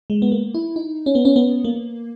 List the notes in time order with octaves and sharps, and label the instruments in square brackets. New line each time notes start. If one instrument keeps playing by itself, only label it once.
[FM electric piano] G#3
B3
A#3
E4
D#4
C#4
B3
C#4
B3
A#3